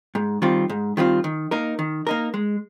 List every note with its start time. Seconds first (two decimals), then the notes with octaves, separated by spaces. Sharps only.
0.15 G#2
0.42 D#3 G3 C4 F4
0.70 G#2
0.97 D#3 G3 C4 F4
1.24 D#3
1.51 A#3 D#4 A#4
1.79 D#3
2.07 A#3 D#4 A#4
2.34 G#3